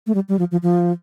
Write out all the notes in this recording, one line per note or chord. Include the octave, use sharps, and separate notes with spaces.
A3
G3
G3
F3
F3
F3